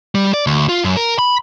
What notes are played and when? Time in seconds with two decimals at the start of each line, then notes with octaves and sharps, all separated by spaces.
0.15 G3
0.34 D5
0.47 D2
0.69 F4
0.84 F#2
0.97 A#4
1.19 B5